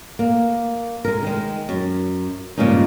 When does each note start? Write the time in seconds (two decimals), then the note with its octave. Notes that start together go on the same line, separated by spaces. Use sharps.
0.19 A#3
1.05 G#3 A#4
1.23 D#3 G#3
1.69 F#2
2.58 G2 A#2 C#3 G#3 C#4 D#4